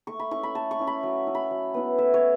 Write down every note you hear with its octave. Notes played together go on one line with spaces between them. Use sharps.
A3 C#6
B5
C#4 E4 C#6
B5
A3 A5
C#6
C#4 E4
B5
F#3
C#4 E4
B5
F#3
B3 E4
A3 E5
C#5